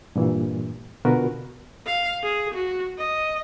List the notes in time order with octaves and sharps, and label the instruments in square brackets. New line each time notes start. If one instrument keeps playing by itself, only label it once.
[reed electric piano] G2 A#2 E3
B2 D3 F4 F#4 A#4 B4
[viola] F5
G#4
F#4
D#5